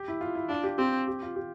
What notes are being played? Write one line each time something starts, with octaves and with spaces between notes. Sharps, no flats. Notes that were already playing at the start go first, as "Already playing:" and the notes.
Already playing: G4
E4
F4
E4
D4 F4
G4
C4 G4
G4
F4
G4